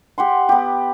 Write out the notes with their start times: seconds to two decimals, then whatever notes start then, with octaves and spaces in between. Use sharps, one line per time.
0.18 G4 F#5 C6
0.49 B3 G4